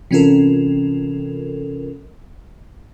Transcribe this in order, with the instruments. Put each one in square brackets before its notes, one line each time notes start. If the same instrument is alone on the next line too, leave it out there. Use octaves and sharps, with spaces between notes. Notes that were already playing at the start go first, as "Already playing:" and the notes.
[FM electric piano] C3 E3 C#4 F4 A4 A#4